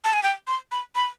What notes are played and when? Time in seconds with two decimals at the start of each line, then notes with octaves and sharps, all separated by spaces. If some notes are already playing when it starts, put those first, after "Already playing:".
0.04 A5
0.13 G#5
0.23 G5
0.47 C6
0.72 B5
0.95 B5